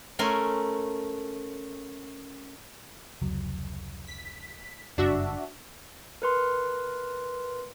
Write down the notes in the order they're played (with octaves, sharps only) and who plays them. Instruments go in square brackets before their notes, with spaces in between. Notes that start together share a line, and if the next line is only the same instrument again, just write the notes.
[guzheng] A3 C#4 A#4 G#5 C6
[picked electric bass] F1 C#2 F#3
[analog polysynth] B6
[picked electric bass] F#1 G2 [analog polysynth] D4 F#4 E5
[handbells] A#4 B4 C6